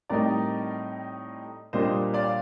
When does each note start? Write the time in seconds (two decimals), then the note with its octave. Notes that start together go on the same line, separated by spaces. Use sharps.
0.10 A2 G3 C4 D#4 A#4 D5
1.73 A#2 G3 A#3 D4 C5 D#5
2.14 D5 F5